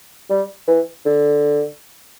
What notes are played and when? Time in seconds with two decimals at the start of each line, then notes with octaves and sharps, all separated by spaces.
0.30 G3
0.68 E3
1.06 D3